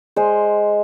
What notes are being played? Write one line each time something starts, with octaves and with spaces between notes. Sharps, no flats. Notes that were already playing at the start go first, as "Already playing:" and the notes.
G#3 C5